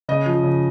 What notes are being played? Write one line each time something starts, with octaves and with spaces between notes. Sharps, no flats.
C#3 D#5
F3
C#3